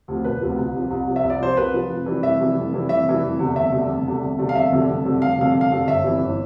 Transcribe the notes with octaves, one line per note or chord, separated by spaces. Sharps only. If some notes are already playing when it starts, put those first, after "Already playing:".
D2 C3 F3
E1 B4
D2 C3 F3
C2
C3 F3
C2
C3 F3
E5
C2
D5
C3 F3 C5
C2 B4
C3 F3
F1
F2 E3 G3
F1 E5
F2 E3 G3
F1
F2 E3 G3
F1 E5
F2 E3 G3
F1
E2 D3 G3
F1 E5
E2 D3 G3
F1
E2 D3 G3
F1
E2 D3 G3
F5
F1 E5
F2 D3 G3
F1
F2 D3 G3
F1 F5
F2 D3 G3 F5
F1
F5
F2 D3 G3
G1 E5
F2 E3 G3
G1